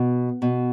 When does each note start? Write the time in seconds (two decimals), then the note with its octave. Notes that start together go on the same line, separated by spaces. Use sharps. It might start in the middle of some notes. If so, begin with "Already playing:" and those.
Already playing: B2
0.42 B2